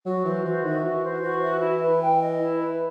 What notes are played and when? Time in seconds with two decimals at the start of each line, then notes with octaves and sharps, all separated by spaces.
0.05 F#3 F#4
0.25 E3 C5
0.44 E3 F#4
0.64 D#3 E5
0.83 E3 F#4
1.03 C5
1.23 F#4
1.42 E5
1.61 E4
1.81 B4
2.01 G5
2.20 D#5
2.40 E4
2.59 B4